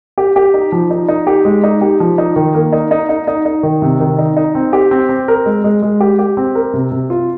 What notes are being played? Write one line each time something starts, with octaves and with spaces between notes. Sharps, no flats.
G4
G4
D#4
F3
D#4
D#4
G4
G#3
D#4
G4
F3
D#4
D#3
A#3
D#4
D#4
D#4
D#4
D#4
D#3
C3
D#3
D#4
D#4
C4
G4
C4
C4
A#4
G#3
G#3
G#3
G4
G4
C4
A#4
C3
C3
F4